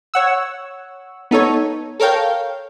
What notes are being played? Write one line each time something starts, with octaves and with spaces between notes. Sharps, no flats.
C#5 F#5 E6
B3 D#4 A4 C#5
A4 A#4 C#5 F5 G5